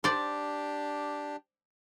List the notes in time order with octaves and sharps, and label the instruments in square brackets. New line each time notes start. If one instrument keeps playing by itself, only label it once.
[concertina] D4 G4 [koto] C5 D5